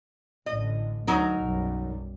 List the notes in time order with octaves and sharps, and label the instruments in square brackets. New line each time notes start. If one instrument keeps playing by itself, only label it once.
[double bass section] A1 D3 [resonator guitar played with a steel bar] D#5
[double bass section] D2 [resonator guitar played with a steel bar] F#3 D#4 A#4
[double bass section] B1 F#2 G3